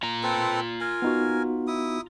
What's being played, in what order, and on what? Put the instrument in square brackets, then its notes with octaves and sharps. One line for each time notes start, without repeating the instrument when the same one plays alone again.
[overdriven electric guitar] F4 A#5
[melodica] C4 A4 B4
A#4 G#5
[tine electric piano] B3 D#4 F#4
[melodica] E4 D#6